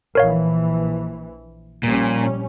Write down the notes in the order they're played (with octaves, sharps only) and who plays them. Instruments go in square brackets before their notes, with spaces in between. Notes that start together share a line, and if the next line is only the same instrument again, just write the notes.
[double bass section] A#1 E3 [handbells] A#4 C#5 F5
[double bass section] A#1 G3 C#4 [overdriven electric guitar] A#2